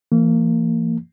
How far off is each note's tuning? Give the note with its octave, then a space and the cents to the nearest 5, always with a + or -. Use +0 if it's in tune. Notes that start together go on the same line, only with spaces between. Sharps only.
E3 +35 A#3 -30